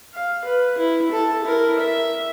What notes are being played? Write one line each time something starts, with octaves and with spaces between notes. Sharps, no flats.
F5
B4
E4
A4 A5
E4 A#4
E5